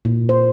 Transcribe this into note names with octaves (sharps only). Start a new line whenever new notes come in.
A#2
C5